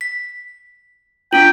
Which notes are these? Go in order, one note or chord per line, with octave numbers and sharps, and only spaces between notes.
B6
C#4 D4 F4 G5